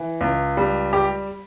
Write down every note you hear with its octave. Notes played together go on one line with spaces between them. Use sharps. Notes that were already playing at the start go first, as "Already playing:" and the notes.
Already playing: E3
C#2
G3
G4